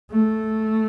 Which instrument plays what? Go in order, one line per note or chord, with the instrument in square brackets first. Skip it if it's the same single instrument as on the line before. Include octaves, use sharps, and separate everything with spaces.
[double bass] A3